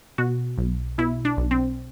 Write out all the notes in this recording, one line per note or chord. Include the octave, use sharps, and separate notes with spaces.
B2 F#4
B1
B2 E4
D4
B1
C4